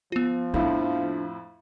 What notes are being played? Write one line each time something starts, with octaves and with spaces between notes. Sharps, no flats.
F3 B3 F4
F2 A2 D4 E4